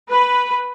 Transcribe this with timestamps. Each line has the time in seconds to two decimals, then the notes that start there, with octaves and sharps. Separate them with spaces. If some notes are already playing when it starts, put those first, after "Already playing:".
0.11 B4